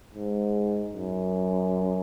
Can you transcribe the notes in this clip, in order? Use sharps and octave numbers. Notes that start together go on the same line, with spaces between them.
G#2
F#2